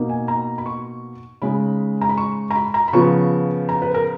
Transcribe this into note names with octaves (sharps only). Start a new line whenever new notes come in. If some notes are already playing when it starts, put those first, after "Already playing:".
Already playing: B2 A#3 D#4
G#5
A#5
B5
C#6
C#3 G#3 D#4 B5
A#5
B5
C#6
A#5
B5
A#5
B5
C#3 F3 B3 C#6
A#5
B4
A#4